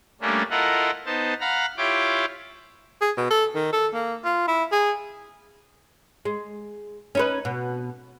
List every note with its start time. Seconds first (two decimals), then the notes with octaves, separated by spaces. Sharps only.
0.21 G3 A3 A#3 C#4 D4
0.50 E4 F4 A4 A#4 D#5 F#5
1.06 B3 D#4 C5 A5
1.41 F5 F#5 A#5 B5 F6
1.77 E4 F4 G4 C#5 G5 D6
3.01 G#4
3.17 B2
3.31 A4
3.55 D#3
3.73 A4
3.94 A#3
4.25 F4
4.48 E4
4.72 G#4
6.25 G#3
7.15 C#4 D#4 B4
7.45 B2